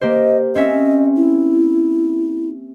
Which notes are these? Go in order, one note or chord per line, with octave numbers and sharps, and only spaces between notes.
A#3 G4 C5 D#5
C4 C#4 D#5 E5
E4